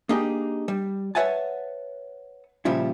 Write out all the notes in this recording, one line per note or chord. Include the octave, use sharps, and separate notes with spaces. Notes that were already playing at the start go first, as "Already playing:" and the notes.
A#3 D4 D#4 G4 G#4
G3
B4 C#5 E5 F#5 G#5 A5
A#2 C#3 F3 G3 E4